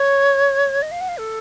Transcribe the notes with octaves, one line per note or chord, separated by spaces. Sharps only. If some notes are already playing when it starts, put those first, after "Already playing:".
Already playing: C#5
D#5
F5
F#5
F5
A4